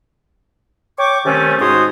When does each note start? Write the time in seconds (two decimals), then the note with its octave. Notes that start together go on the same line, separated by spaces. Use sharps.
0.99 C#5 G5 C#6 D6
1.26 C3 D#3 G3 A3 C#4
1.60 G#2 F#4 C5 C#5 D#6